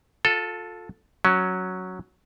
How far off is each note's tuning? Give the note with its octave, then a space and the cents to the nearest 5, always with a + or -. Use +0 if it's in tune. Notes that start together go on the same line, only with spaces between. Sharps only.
F4 +30 A4 +0
F#3 +0 C#4 +0